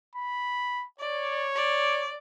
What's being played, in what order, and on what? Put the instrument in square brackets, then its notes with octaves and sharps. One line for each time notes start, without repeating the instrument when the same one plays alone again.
[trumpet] B5
[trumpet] C#5 [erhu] D5
[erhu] D5